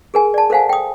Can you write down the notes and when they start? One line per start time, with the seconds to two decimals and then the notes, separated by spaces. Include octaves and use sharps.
0.14 G#4 A#4 G#5
0.34 D5 A5
0.50 A4 A#4 C5 F5 F#5 G#5
0.69 G5 D#6